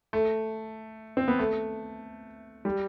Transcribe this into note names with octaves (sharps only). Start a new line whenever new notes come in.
A3
C4
B3
A3
G3